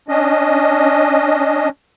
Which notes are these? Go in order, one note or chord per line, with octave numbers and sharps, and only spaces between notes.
C#4 D4 D#5